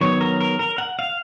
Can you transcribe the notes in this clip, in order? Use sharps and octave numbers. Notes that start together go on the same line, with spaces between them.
D#3 F#3 B3 C#5
A#4
A#4
A#4
F#5
F5